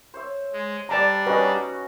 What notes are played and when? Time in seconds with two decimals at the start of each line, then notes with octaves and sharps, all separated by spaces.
0.14 C5 C#5 E5
0.53 G#3
0.89 G3 D4 D5 A5 A#5
1.26 C#4 D#4 F#4 B4 D#5